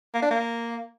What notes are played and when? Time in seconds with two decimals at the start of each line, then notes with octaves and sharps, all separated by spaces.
0.14 A#3
0.22 D4
0.30 A#3